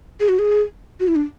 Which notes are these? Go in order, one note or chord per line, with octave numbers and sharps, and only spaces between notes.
G#4
F#4
G#4
F#4
E4
D4